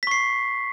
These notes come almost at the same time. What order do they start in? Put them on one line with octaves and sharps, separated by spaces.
B6 C#6 C7